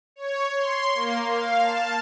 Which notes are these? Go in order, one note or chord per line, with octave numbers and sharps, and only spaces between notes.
C#5
C6
A#3
F5
A5